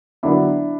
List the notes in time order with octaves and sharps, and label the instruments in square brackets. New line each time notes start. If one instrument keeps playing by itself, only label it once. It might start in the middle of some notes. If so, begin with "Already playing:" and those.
[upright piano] D3 F#3 B3 D4 E4